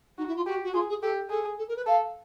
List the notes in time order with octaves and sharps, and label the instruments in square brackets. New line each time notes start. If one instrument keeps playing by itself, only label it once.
[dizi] D#4 [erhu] F#4
[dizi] E4
F4
[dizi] F#4 [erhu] G4
[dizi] F#4
[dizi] F4 [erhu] G#4
[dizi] G#4
[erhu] G4 [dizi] A4
[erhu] G#4 [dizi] A4
[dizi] A4
A#4
B4
[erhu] A4 [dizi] F5